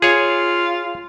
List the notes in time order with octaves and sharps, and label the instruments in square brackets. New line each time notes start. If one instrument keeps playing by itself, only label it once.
[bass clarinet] F4 [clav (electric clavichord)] G#4 C#5